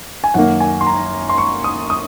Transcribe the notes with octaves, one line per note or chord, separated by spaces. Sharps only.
G#5
F#2 D#3 A#3 F#5
G#5
C6
A#5
C6
C#6
D#6
D#6